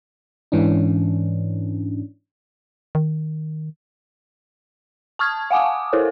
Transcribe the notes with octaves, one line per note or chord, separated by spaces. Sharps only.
G#2 E3 C#4 D4
D#3
A5 C#6 D#6 F6 G#6
F5 F#5 G#5 D6 D#6
E4 A4 A#4 C5 C#5